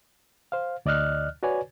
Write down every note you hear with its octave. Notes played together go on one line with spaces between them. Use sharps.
C5 F5
D2 D5 D#5 F6 F#6
F#4 B4 C#5 D5 G#5